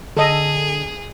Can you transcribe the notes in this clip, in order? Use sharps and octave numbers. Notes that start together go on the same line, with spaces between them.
D3 G#4 A4 D#5